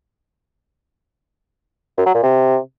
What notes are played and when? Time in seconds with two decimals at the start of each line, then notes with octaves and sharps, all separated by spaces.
1.98 F#2
2.06 F#3
2.14 A#2
2.23 C3